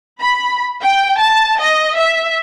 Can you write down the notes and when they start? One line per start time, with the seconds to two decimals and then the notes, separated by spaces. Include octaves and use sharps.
0.19 B5
0.82 G5
1.17 A5
1.58 D#5
1.96 E5